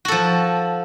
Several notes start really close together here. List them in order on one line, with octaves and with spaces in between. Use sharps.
F#4 A4 F3